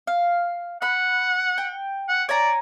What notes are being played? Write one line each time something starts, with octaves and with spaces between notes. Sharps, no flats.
F5
F#5 B5 F#6
G5
F#5
C#5 D5 G#5 A#5